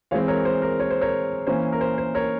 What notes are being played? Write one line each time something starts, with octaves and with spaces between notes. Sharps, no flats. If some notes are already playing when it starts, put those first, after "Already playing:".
E3 G#3 C4 C#5 F5
A#4 C#5
C5
A#4
C#5
C5
A#4 C#5
E3 A#3 C#4 C5
A#4
C5
C5
A#4 C#5